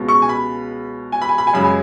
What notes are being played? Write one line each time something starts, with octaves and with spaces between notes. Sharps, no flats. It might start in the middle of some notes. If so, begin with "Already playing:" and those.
Already playing: C#2 B2 G#3
C#6
G#5
B5
G#5
B5
G#5
B5
G#5
F#2 C#3 G#3 B5
G#5